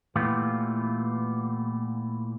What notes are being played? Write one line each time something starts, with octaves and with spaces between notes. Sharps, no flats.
A#2 E3 A3 B3 F4 G4